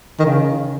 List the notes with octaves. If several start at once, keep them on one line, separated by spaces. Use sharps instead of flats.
D#3
C#3